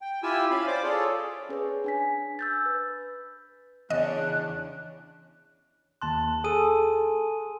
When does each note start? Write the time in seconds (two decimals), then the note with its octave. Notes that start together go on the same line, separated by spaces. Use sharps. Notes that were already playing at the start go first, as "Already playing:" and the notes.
0.02 G5
0.23 E4 F4 G4 G#5 E6
0.51 C#4 F5 G#5 B5
0.67 C5 D5 D6
0.84 F4 G#4 A4 C#5 D5
1.49 C#4 G#4 B4 C#5
1.84 D4 G#5 B6
2.39 E6 G6 A6
2.66 B4
3.90 E2 C#3 C#4 D4 D#5 F#6
6.02 D#2 A5 C6 F#6
6.44 G#4 A4 G#5 D#6 D#7